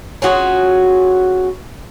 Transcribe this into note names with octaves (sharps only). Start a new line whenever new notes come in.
C#4 F4 F#4 G#4